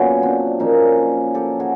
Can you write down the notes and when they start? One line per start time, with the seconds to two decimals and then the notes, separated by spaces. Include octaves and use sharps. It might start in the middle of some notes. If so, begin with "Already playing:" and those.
Already playing: A#2 F#3 B3 C#4
0.23 C4 D4
0.60 A#2 F3 C#4 D#4
1.34 G4 A4
1.60 F#4 G#4